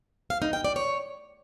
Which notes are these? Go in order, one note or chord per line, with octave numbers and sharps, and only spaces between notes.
F5
D#4
G5
D5
C#5